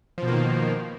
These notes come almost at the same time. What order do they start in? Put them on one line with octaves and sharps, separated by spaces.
F3 B2 A#3 D#3